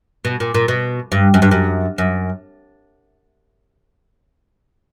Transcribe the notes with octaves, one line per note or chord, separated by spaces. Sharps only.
B2
A#2
A#2
B2
G2
F#2
G2
F#2
F#2